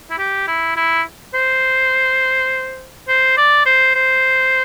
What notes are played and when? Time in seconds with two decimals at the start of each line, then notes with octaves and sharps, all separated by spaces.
0.10 E4
0.18 G4
0.47 E4
0.76 E4
1.34 C5
3.08 C5
3.37 D5
3.66 C5
3.95 C5